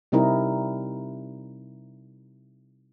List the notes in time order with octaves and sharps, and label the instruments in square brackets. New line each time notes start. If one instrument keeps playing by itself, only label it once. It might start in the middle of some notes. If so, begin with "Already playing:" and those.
[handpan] C3 G3 C4 D#4 E4 A#4